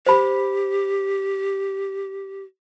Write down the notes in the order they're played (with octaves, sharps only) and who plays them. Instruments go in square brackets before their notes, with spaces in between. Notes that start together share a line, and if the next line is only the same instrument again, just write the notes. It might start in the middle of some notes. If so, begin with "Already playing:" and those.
[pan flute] G4 [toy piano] C5 B5